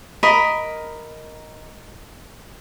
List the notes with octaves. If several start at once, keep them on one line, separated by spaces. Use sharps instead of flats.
A#4 D#5 B5